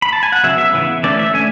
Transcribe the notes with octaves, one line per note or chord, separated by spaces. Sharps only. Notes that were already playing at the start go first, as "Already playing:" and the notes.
B5
A5
G#5
F#5
C#3 F#3 B3 E5
E5
C#3 E3 B3
E3 A3 C#4 D5
E5
D3 A3 C#4 G#5